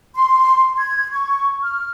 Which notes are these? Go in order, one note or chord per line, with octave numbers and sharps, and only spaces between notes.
C6
G#6
C#6
F6